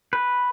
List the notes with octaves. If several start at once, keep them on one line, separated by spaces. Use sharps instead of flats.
B4